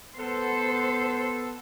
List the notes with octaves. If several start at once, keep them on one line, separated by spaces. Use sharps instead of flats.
B3 A4 C5